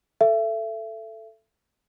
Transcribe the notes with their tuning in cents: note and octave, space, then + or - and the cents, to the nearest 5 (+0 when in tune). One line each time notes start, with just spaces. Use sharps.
A4 +0 E5 +30